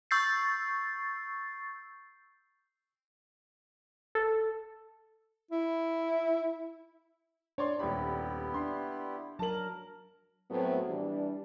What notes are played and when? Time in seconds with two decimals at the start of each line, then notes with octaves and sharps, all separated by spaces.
0.11 C#6 E6 G6 A6 C7
4.15 A4
5.51 E4
7.58 D4 C#5 D5 C6
7.79 D#1 B3 E4 G4 B5
8.54 D4 C6
9.39 F#3 A#4 A5 F#7
10.50 A2 F#3 A3 B3 C4 F#4
10.87 E3 G3 D4